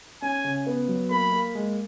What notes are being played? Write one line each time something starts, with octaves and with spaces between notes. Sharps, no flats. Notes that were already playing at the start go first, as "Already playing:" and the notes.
C#4 G#5
C#3
B3
F#3
A#3 B5
A#3
G#3